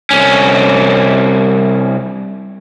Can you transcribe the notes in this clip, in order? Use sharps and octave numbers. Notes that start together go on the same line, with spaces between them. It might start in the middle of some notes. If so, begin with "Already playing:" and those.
C2 C#4